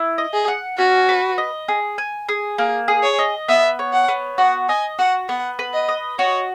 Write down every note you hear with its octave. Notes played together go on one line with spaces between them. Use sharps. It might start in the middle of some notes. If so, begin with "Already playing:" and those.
Already playing: E4
D#5
G#4
F#5
C#4 F#4
B4
D#5
G#4
G#5
G#4
A#3 G#4
G#4
C#5
D#5
B3 E5
C#5
F#5
B3
F#4 F#5
D#5 G#5
F#4 F#5
B3 F#5
B4
D#5
D#5
F#4 C#5